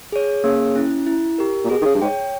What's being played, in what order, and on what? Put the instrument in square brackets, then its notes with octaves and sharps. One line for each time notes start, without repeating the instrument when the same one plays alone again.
[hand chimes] G#4 C#5
[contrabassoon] C#3 [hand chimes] A#3
[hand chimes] C#4 E4
E4
G4 A#4
[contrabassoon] A#2
[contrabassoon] B2 [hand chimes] G#4
[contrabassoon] D#3
C#3
G2
[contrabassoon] G#2 [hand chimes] C#5 G5